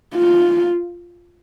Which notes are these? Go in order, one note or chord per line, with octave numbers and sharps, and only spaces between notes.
F4